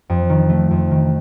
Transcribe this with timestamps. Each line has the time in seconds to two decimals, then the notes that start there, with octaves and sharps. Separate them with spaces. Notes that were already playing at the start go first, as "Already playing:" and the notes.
0.09 F2
0.29 D#3
0.50 A3
0.71 F2
0.91 D#3